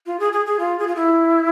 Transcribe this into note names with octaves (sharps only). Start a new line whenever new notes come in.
F4
G#4
G#4
G#4
F4
G#4
F4
E4